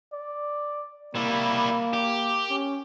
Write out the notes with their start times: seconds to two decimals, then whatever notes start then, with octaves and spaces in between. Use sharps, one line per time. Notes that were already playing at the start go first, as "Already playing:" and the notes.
0.13 D5
1.15 G3 A#3 E4
1.93 G4
2.50 C#4